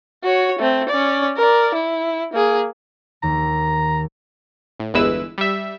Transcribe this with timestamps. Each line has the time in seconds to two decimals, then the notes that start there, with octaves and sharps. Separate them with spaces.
0.24 F#4 C#5
0.59 A3 C4
0.89 C#4 D5
1.37 A#4 D5
1.74 E4
2.33 A#3 G#4
3.23 D#2 A#5
4.80 A2
4.94 G1 E2 G#3 E4 B4 E6
5.38 G3 E5